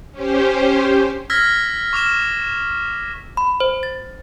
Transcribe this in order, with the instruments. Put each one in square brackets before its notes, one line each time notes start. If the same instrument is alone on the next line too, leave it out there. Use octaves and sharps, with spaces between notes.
[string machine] C#4 G4 C5
[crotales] E6 F6 G#6 A#6 B6
C#6 D6 F6 E7
[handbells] B5
C5
A6